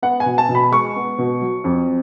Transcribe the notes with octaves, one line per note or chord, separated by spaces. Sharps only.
B3 F#5
G#5
B2
A5
B2
B5
G#3 C#6
B3
B2
F#3
F2